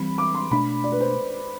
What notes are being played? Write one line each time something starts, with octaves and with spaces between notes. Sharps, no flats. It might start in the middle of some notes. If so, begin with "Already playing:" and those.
Already playing: E3 G3 C4 B5
D6
C6
B2 A3 D4 B5
D5
B4
C5